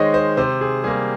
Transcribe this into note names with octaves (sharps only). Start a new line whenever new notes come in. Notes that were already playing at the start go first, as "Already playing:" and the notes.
Already playing: D#3 G#3 C5 C#5 D#5
C5
C3 C5
G#4
G3 A#3 G#4